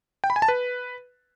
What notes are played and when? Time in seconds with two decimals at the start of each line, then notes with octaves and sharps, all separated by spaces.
0.24 G5
0.30 B5
0.36 G#5
0.42 A5
0.48 B4